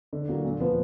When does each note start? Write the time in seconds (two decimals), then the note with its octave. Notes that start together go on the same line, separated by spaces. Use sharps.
0.13 D3
0.28 F#3 A#3
0.44 A#2
0.60 F3 B3 F4